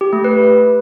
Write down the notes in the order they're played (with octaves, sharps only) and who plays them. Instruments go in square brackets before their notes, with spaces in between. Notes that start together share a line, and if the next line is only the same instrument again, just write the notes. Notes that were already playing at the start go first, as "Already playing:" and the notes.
[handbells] G4
A3
B4